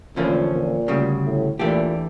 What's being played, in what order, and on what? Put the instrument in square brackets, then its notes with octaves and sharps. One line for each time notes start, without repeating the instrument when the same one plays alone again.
[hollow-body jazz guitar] E2 D3 F3 A3 C#4 [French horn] A#2
[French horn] A#2
[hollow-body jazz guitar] D2 C#3 G3
[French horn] A2
[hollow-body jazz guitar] E2 E3 A3 D4 G4 [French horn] A#2